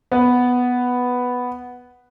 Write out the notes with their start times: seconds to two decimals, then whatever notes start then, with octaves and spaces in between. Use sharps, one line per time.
0.12 B3 B4